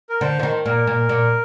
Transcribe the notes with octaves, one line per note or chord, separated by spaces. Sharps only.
A#4
D3 C5
F3
D#3
A#2 A#4
A#2
A#2